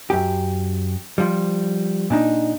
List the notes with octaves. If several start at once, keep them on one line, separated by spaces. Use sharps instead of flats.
F#2 G4
F3 G3
A#2 D4 D#4